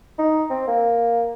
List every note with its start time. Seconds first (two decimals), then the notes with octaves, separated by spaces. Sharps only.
0.19 D#4
0.50 C4
0.68 A#3